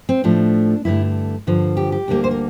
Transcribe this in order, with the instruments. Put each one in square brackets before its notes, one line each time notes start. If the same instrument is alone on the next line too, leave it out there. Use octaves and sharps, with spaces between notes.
[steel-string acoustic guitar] C4
A2 F3 A3 D4
G2 D3 A3 E4
G2 D3 F3
G4
G4
D2 D3 G3 A#3
C5
A#4